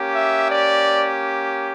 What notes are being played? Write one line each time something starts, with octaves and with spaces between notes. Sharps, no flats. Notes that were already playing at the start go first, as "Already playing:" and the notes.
Already playing: A#3 C#4 G4
E5
D5